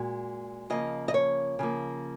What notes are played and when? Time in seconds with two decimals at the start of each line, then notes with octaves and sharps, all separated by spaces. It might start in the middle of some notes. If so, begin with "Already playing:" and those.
Already playing: A#2 G#3 F#4
0.70 C#3 F3 A#3 D#5
1.08 D#5
1.14 C#5
1.59 C#3 F3 A#3